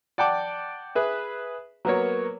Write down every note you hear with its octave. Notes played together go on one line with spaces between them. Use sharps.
D5 F#5 G5 A5 D6
G#4 B4 E5
F#3 A#3 B3 A#4 C#5